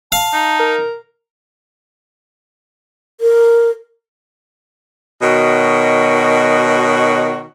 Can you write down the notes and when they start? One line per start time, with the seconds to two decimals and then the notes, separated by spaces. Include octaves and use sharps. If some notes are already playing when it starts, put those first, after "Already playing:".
0.12 F5 A5
0.33 D#4
0.60 A#4
3.21 A#4
5.21 B2 D#3 F#4 C#5 D#5